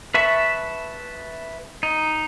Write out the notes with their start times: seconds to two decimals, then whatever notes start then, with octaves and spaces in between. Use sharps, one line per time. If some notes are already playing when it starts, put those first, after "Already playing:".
0.14 B4 E5 A5 C#6
1.83 D#4